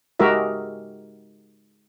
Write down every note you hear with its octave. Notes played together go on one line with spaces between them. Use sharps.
G#3 F#4 G4 A#4 E5